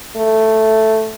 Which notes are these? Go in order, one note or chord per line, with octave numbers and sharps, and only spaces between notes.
A3